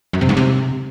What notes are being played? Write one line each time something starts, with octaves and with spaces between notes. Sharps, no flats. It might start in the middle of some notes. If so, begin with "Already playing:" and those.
F#2
C3
G#2
C3